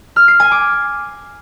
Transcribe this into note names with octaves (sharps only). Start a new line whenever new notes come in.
F6
C7
G#5
D6